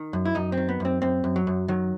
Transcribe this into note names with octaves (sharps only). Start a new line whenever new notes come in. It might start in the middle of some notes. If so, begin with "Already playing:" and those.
Already playing: D#3
F#2
E4
F#2 D#4
C4
D#3
B3
F#2 C4
F#2 C4
F#2
F#3
F#2
D#3 F#3